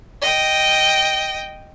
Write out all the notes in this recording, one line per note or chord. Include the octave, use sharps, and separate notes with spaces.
D#5 G5